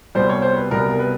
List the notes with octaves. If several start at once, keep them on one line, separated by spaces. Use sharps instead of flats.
C2 B2 G3 C5
C#5
C5
B4
C2 B2 G3 A#4
B4